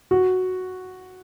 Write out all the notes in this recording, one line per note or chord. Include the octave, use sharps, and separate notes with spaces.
F#4